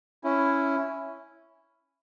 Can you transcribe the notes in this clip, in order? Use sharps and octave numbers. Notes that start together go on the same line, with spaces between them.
C#4 E4